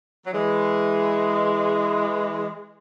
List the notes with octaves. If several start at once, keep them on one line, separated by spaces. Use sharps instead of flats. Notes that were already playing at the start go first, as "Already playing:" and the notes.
F#3
E3 G#3